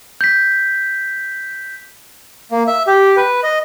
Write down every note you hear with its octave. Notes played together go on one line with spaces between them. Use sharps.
G6 B6
A#3
E5
G4
B4
D#5